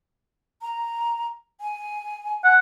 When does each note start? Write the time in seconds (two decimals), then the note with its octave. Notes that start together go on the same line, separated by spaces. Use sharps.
0.62 A#5
1.61 G#5
2.45 F#5